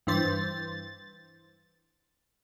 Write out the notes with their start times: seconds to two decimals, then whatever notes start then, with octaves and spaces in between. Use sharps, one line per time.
0.07 G2 E3 C5 A6